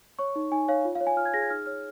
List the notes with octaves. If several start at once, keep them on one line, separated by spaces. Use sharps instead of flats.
C#5 C#6
D#4
D#4 G#5
C#5 F5
F4
F5
C#5
G#5
F4 F6
G#6
G#4 A#6
G#6
D#4 F6
C#5 F6